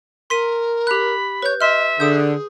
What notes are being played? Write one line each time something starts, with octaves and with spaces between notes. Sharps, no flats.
A#4 C6 B6 D#7
G4 B5 F#6
B4 C#5 G6
D#5 E5 C6 F6
D3 G#4 D#6 G6